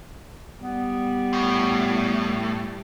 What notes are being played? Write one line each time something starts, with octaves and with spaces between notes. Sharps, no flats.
G3 B3
A2